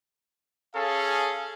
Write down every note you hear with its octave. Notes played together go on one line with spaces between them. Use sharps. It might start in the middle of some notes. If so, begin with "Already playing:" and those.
C#4 G#4 A4 F5